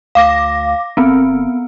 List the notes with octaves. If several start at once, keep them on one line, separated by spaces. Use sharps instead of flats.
D2 F5 D6 A#6
G1 B3 C4